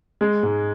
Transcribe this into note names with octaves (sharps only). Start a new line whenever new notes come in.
G#3
G#2